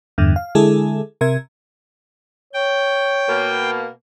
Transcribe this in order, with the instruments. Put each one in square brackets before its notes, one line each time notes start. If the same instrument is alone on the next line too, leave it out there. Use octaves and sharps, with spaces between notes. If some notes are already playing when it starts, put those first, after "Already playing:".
[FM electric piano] E2 G2 D3
F5
D3 G#3 E4 G#4 A4
C3 A#4 E5 G#6
[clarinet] C#5 [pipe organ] G5
[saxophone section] B2 A#3